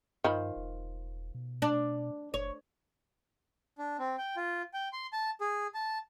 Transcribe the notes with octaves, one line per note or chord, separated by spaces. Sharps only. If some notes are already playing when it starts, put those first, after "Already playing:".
G2 D#3 F3 B5
E1
B2
D4
F#1 C#5
D4
C4
G5
F4
G5
C6
A5
G#4
A5